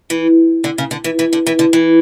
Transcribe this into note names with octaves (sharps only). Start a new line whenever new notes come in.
E3
D3
C#3
D3
E3
E3
D3
E3
D3
E3